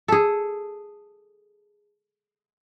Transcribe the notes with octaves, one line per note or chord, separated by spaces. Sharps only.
G#4 A4